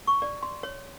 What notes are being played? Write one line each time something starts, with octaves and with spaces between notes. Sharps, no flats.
C#6
D5
C6
C#5